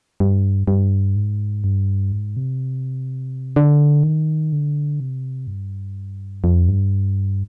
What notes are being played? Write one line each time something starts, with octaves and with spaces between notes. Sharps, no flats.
G2
G2
G#2
G2
G#2
C3
D3
D#3
D3
C3
G2
F2
G2